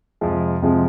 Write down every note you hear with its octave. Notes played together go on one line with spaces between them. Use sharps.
F2 C3 F3 G#3
F2 C3 F3 G#3